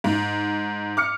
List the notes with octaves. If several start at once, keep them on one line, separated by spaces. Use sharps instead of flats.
G#2
D6 F6 C#7